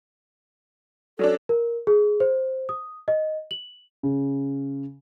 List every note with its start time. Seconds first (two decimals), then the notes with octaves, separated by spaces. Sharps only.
1.19 F#3 C#4 D4 A4
1.49 A#4
1.87 G#4
2.20 C5
2.69 D#6
3.08 D#5
3.51 F#7
4.03 C#3